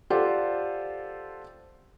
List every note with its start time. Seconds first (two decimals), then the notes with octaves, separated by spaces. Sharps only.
0.10 F4 G4 A4 C5 D5 F#5